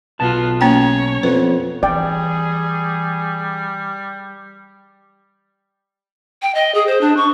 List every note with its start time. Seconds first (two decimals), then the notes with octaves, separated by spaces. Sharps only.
0.20 B1 B3 F4 A5
0.61 A#3 C#4 C#5 G5
1.23 F2 B3 B4
1.83 E3 G3 G#4 D5 G5
6.42 G5
6.55 D#5
6.75 G#4
6.87 C5
7.01 D4
7.17 C#6